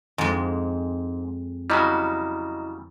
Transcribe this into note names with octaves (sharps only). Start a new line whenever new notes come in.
F2 G#2 G#3
C#3 F#3 G3 E4 D#5 A#5